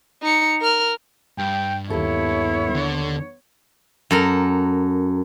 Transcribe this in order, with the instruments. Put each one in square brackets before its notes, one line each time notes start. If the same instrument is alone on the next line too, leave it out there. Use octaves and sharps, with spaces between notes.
[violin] D#4 C#7
A#4 F6
[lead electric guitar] G2 [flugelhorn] G5
[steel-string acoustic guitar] D#2 A4 [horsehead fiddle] B3 C#5 [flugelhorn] E4
[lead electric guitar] D3
[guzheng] F#2 A4 A#4